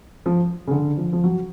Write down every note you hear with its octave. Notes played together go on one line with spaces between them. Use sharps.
F3
C#3
D3
F3
F3
F#3